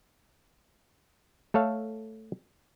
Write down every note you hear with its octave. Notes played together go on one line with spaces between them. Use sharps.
A3 A4 C#5 F5